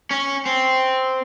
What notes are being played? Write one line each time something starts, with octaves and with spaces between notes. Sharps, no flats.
C#4
C4